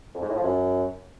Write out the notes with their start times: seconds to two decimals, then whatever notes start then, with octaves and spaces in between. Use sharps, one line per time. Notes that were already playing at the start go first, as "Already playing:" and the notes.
0.15 F2
0.22 G#2
0.29 A2
0.36 F3
0.44 F#2